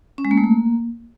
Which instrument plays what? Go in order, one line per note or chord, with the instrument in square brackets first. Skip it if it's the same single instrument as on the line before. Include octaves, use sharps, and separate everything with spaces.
[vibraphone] C#4
G#3
A#3
A3
A#3